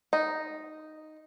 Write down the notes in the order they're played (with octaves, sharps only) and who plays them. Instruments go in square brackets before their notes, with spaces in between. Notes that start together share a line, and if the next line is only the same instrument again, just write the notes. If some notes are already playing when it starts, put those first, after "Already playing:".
[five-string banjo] D#4